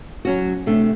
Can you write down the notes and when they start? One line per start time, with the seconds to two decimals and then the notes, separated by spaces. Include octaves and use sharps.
0.25 F#3 C#4 F#4
0.66 C3 A3 D4